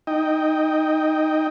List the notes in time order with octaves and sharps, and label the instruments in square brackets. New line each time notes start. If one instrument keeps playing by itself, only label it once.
[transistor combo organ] D#4 D#5 G5